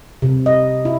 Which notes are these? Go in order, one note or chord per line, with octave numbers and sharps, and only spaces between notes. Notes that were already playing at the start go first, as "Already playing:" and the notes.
C3
D#5
E4